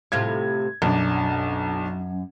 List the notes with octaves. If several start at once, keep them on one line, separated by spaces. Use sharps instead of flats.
A2 C3 F4 G#6
B1 F#2 D4